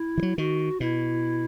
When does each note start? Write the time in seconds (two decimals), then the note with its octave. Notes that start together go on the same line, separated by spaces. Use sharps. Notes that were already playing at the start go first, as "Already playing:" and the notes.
Already playing: E4
0.18 E3
0.23 F#3
0.37 D#3 F#4
0.80 B2 E4